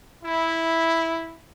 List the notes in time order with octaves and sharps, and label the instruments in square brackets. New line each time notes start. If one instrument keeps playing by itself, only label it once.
[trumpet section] E4